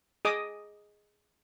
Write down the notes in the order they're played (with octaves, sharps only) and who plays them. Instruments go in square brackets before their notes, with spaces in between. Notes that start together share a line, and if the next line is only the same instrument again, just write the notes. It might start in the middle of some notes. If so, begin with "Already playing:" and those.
[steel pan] G#4 D#5 D6 D#6